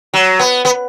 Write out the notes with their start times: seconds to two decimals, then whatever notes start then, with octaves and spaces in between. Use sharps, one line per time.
0.14 F#3
0.39 B3
0.65 B3